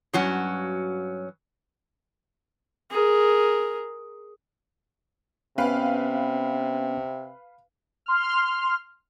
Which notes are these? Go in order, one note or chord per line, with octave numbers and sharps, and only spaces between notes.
G2 F#3 C#4 F#4
G#4 A#4
C3 B3 C#4 B4 F5 G5
C6 F6